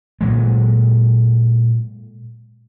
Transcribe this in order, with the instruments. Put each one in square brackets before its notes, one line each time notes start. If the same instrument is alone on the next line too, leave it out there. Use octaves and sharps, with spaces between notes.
[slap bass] A#2 F#3 G#3